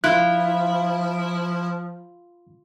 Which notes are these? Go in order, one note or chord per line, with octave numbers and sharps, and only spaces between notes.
F3 E4 F4 F#6